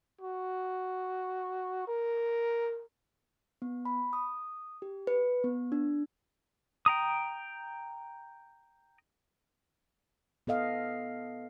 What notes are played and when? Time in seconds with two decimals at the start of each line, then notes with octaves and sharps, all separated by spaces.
0.21 F#4
1.87 A#4
3.62 B3
3.85 B5
4.13 D#6
4.82 G4
5.07 B4
5.44 B3
5.72 D4
6.86 G5 A#5 D#6
10.47 B3 A4 D#5 F5